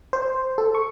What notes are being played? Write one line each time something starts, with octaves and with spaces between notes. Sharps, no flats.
C5
A4
C#6